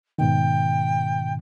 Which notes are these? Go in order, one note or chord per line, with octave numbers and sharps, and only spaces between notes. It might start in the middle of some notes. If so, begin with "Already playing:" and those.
G#2 B2 D#3 G5